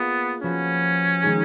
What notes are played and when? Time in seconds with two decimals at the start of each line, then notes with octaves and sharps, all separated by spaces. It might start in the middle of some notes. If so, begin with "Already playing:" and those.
Already playing: A#3 B3 F4 G#4 D#5
0.42 F3 B3 C#4 F#4
1.23 D#3 G#3 D#4 G#4